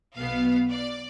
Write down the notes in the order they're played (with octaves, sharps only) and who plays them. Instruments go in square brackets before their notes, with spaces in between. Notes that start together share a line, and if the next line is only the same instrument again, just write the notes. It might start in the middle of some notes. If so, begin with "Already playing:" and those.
[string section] B1 B2 B3 F5
D5